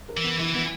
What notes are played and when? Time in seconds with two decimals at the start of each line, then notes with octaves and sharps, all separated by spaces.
0.09 A#4
0.17 E3
0.24 B3
0.39 E3 E4
0.54 E3 B3